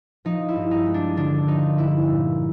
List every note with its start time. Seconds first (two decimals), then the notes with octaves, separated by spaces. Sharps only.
0.25 F3 D#4
0.49 E4
0.56 G2
0.71 D#4
0.86 G#3
0.94 D4
1.17 D3 D4
1.48 F3 D#4
1.78 G2 E4
2.09 A#2